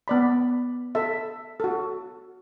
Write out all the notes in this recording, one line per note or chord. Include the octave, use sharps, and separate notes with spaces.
B3 D5 B5
A4 E5
F#4 A4